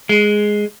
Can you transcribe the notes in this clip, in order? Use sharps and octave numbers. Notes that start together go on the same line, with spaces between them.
G#3